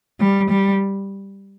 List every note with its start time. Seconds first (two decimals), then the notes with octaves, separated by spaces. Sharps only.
0.20 G3
0.50 G3